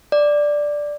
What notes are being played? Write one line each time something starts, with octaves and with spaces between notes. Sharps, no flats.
D5